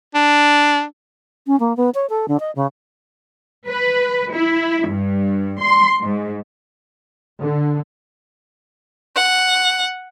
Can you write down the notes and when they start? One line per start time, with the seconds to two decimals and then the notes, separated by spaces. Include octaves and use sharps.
0.14 D4
1.47 C#4
1.60 A#3
1.77 B3
1.94 C#5
2.09 A4
2.28 D3
2.40 D#5
2.55 C#3
3.67 B4
4.31 E4
4.86 G2
5.61 C6
6.00 G#2
7.40 D3
9.16 F#5